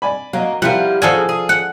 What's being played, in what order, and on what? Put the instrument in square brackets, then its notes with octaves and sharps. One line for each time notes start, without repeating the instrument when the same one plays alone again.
[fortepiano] D5 G#5 B5
[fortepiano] F#3 D#5 [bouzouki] A#3
[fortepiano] F3 A#4 [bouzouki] G3 E4 F4 [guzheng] F#5
[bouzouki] A2 F#4 G#4 [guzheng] F3 A4 G#5 [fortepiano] D5 F5
[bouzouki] G#4
[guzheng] F#5